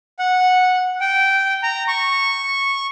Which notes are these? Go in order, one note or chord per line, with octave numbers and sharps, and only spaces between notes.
F#5
G5
A#5
C#6